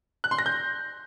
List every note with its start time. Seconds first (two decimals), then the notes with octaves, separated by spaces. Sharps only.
0.24 F#6
0.31 C6
0.39 A#6
0.46 G6